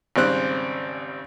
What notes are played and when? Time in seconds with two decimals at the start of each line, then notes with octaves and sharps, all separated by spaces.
0.16 G#1 C#3 G3 C4 F#6